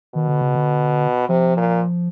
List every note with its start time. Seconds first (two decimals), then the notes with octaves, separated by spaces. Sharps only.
0.15 B2 D#3
0.28 D3
0.41 C#3
0.55 D3
1.29 C3 F3
1.57 A#2